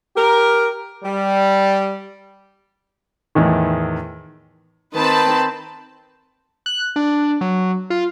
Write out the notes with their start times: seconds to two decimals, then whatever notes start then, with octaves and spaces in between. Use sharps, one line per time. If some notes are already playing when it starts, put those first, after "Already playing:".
0.16 G4 A#4
1.03 G3
3.35 E2 A2 D#3
4.94 D#3 C4 B4 A5 B5
6.66 F#6
6.96 D4
7.41 F#3
7.90 F4